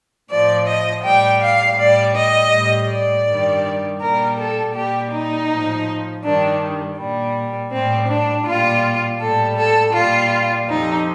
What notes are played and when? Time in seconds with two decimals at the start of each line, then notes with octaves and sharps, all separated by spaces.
0.30 A2 F3 D5
0.67 D#5
1.04 A2 G3 G5
1.41 F5
1.78 A2 G3 D5
2.15 D#5
2.52 A2 G3
2.89 D5
3.26 G2 D#3 G3
4.01 A#2 G3 A#4
4.38 A4
4.75 A#2 G3 G4
5.12 D#4
5.49 A2 F3
6.23 G2 D#3 G3 D4
6.97 A#2 G3
7.71 A2 G3 C4
8.08 D4
8.45 A#2 G3 F4
9.20 A2 G3 A4
9.57 A4
9.94 A#2 G3 F4
10.68 F2 C3 F3 D#4